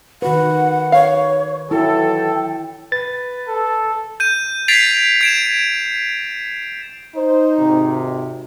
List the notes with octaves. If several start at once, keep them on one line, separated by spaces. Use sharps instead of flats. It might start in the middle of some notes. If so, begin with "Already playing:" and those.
D#3 F#4 B4 F#5
C#5 F5
E3 F#3 E4 A4 G5
B4 A6
A4
G6 D#7
G#6 A6 B6 C7 D7 F7
G#6 D7 E7
D#4 C5
G#1 C3